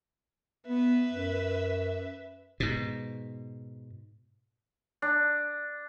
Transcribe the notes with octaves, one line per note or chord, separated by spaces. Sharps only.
B3 B4 E5
F#2
G#2 B2
D4